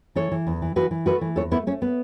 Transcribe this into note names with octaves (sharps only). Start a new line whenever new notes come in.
E3 A4 C#5
E3
E2
E3
E3 F#4 B4
E3
A3 F#4 B4
E3
E2 A4 C#5
A3 B3 E4
A3 C#4
B3